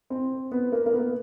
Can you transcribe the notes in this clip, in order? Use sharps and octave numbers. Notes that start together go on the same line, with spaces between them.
C4
B3
A#3
A#3
B3